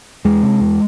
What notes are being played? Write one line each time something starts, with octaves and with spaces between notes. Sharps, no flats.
E2 G#3
C3
E2